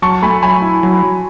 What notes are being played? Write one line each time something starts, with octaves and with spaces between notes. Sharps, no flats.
F#3 A5 C#6
A3 G#5 B5
F#3 G#5 B5
E4
F#3
F#3